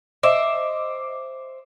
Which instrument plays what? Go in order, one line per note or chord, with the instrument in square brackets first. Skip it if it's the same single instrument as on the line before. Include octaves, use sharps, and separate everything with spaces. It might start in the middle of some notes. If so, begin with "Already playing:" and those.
[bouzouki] C5 E5 [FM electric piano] D#5 D6